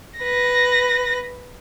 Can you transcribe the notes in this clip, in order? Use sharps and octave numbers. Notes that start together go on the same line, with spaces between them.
B4 A#6